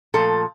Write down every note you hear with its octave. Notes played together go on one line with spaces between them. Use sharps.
A#2 F3 A3 A4